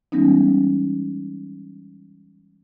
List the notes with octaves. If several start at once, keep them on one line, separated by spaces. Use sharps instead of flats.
E3 G3 G#3 B3 C#4 D#4